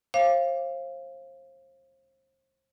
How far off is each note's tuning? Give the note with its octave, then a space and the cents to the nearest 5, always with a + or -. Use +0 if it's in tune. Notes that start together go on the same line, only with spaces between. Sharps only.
C5 +35 F5 -15 D6 +0